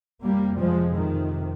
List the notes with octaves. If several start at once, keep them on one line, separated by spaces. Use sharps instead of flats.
F2 C3 G3 A#3
F3 G#3
D#3